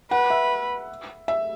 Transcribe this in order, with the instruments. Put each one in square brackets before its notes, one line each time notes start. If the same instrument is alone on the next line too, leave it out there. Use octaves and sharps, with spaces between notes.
[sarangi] B4 [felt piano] F#5
[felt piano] E5
E5